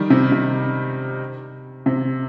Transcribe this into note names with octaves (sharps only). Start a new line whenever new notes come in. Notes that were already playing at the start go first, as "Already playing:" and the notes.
Already playing: D#3 G3
C3
C3
C3